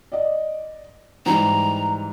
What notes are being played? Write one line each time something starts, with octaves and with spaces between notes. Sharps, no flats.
D5 D#5
G#2 E3 G3 A#5